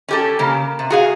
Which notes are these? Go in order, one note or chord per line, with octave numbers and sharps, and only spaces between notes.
C#4 G4 A4
C#3 A#3
C3
F#4 G#4 F5